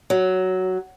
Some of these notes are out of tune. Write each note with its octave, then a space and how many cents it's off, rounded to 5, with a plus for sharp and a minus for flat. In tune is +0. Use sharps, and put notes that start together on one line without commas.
F#3 +5